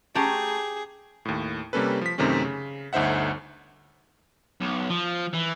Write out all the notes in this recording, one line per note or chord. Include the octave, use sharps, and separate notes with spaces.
A3 C#4 G4 G#4 A#5
D#2 A2
C3 G3 A#3 C#4 A4 B4
F3 B6
F#2 C3 D#3 A3 C4 C#4
C#3
G1 D2 D#4 C5 E5 F#5
B1
F3
E3